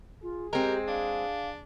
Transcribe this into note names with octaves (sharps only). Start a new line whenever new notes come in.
F4 G#4
G#3 C4 G4 A#4
D4 F5